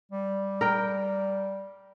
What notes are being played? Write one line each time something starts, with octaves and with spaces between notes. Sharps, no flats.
G3
A#4 G5